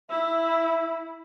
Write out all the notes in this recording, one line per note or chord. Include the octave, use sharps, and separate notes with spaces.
E4 E5